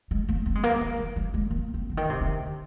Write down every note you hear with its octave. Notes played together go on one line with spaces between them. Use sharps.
G#3
A#3
C4
G#3
A#3
G3
A#3
G3
G#3
A#3
C4
D3
D#3
C3
D3